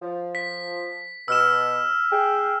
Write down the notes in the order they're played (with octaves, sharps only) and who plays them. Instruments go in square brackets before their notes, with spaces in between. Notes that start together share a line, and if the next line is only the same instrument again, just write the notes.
[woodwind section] F3
[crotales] B6
[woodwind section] B2 [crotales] E6 F6 E7
[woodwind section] G#4 G5